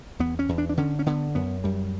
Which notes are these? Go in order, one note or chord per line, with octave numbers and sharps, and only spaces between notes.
E2 B3
C#4
E2
D4
D4
D3 C#4
C#4
D3 B3
F#2 B3
F#2 G3